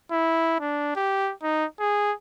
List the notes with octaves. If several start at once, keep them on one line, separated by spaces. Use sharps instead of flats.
E4
D4
G4
D#4
G#4